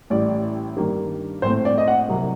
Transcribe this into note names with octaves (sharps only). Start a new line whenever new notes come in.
A1 A2 G3 D5
G2 D#3 G3 A#3
A#1 A2 A3 C4 C5
D5
D#5
F#5
C2 C3 F#3 A#3